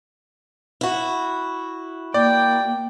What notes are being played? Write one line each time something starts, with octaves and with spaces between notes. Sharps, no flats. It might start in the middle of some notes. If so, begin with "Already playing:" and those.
E4 F#4
A#3 D5 G5